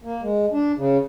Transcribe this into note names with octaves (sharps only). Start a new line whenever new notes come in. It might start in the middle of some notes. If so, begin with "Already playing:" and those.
A#3
G#3
D4
C#3